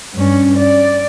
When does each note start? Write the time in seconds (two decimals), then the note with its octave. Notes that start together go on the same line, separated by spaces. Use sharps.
0.14 G2 C#4
0.59 D5